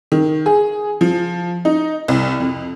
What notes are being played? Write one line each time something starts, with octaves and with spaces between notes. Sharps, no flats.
D#3
G#4
F3
D#4
C2
F2